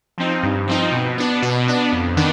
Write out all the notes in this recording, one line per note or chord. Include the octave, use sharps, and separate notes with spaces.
F3 C4 D#4
G2
F3 C4 D#4
B2
B3 D4
B2
B3 D4
F2
D#3 B3 D4